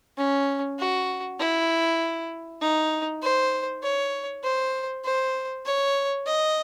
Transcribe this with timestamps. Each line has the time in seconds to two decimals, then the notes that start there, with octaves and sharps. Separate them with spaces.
0.18 C#4
0.79 F#4
1.39 E4
2.61 D#4
3.22 C5
3.83 C#5
4.43 C5
5.05 C5
5.65 C#5
6.26 D#5